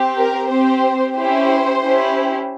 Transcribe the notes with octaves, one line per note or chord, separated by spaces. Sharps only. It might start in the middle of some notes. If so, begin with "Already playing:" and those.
Already playing: C4 G4
A#4
C4 G4 C5
C#4 E4 G4 C5
C#4 E4 G4